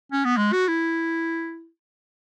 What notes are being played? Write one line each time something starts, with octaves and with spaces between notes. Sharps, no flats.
C#4
B3
G#3
F#4
E4